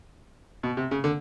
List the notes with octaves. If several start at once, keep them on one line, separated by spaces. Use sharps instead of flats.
B2
C3
C#3
D3